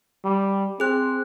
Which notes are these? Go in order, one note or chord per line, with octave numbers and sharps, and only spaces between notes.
G3
C4 G#4 F#6